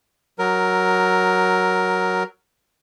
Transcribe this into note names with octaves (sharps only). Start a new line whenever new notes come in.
F#3 A#4